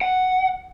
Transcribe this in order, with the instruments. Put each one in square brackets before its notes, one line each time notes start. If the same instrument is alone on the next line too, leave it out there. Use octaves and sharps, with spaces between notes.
[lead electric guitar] F#5